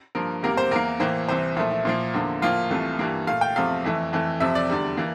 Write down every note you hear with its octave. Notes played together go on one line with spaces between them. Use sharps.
G2 F3 A#3 A#4
E2 C3 G3 A#3 A#4
C5
E2 E3 A#3 A#4
A2 E3 A#3 C5
C2 C3 E3 C5
A#2 F3 A3 E4
E4
A#2 F3 A#3
E2 D3 F3 A#3
A2 F3 A#3 F4
C2 C3 E3 A3
G2 E3 G3 A#3
A#2 A3 F5
G5
E2 C3 F3 A3 F5
F2 E3 A3
F2 E3 A3
F2 C3 F3 E5
D5
E2 D3 G3
E3 A#3